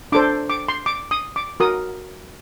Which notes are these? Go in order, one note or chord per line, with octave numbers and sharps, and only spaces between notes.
D4 A4 C5 D6
D6
C6
D6
D#6
D6
F#4 A#4 D#6